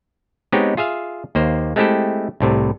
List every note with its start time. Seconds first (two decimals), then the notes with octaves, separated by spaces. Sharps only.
0.52 G#3 B3 C4 D#4 G4 C#5
0.77 F4 G#4 E5 F5
1.35 D#2 A#3 C5
1.76 G#3 A3 C4 E4 G4 A4
2.40 C2 A2 C3